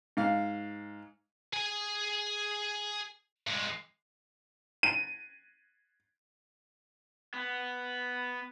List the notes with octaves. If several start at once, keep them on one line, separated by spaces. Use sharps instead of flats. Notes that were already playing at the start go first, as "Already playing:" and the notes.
G#2 F5
G#4 G#5
G2 G#3
D#7
B3